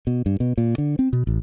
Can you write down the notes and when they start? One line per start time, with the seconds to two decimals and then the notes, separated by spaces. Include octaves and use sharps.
0.07 B2
0.26 G2
0.40 B2
0.58 A#2
0.78 D3
0.99 C4
1.13 B2
1.27 A1